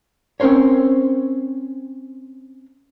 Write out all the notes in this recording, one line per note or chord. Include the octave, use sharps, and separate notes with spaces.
C4 C#4 A#4 C5 C#5